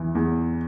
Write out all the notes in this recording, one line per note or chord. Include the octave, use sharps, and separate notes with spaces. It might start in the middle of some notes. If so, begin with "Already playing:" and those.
Already playing: E2 E3
E2